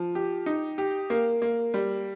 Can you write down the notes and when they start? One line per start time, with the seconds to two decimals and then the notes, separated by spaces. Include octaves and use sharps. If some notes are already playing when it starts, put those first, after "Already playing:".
Already playing: F3
0.15 G4
0.46 D#4
0.78 G4
1.10 A#3
1.42 A#3
1.74 G3